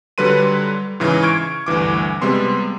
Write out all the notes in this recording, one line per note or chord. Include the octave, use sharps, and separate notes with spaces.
D3 F#3 G3 B4 C6 D#7
G#2 C#3 E3
C#6 F6 G#6 D7
D2 G2 E3 D6
C3 G3 G#3 B3 C6